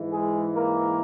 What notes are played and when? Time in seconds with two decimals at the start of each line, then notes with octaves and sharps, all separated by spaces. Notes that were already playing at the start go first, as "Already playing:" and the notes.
Already playing: G#2 E3
0.12 G#3 G#4
0.54 A#3 A#4